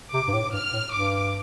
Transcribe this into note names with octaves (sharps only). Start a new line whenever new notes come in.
C3 D6
G2
A2
G2 F6
A2
G2 D6